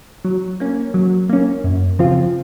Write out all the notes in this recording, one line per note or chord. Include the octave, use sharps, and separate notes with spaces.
F#3
A#3 C#4
F#3
A#3 C#4
F#2
C#3 F3 C4 F4